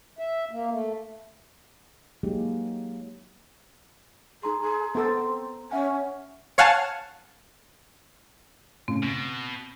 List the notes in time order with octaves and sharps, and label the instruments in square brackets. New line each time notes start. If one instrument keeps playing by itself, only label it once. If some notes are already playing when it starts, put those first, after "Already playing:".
[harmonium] E5
A#3
A3
[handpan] F#3 G#3 A#3 D#4 G4
[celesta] D#4 A#5 C6 [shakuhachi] G#4
[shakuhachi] G#4 [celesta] A#5 C6
[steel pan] B3 A4 [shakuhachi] C4
[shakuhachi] C#4 [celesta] E5 F#5 G#5
[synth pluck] C#5 F5 F#5 G#5 A5
[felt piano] A2 C#3 [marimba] C4
[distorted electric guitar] B2 [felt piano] A#6